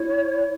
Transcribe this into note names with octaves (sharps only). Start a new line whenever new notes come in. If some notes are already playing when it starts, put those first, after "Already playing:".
Already playing: E4 C#5